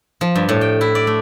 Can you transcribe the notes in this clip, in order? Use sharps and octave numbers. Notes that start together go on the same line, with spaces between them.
F3
G2
A2
G5
E4
D5
A3